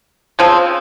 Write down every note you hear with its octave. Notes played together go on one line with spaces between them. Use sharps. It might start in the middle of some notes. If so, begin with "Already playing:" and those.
C#3 F3 C4